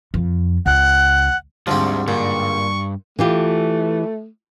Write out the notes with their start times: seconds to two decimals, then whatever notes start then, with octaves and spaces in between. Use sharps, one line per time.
0.14 F2
0.66 C#2 F#5
1.67 D2 G#2 D3 F3 G3 C4
2.08 G2 A#2 C#6
3.19 E3 A3 F4 G4